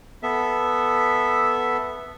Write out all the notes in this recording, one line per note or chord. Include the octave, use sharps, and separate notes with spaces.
B3 A4 E5